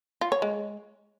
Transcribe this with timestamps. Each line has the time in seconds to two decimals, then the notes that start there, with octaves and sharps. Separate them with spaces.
0.21 F4
0.32 C#5
0.42 G#3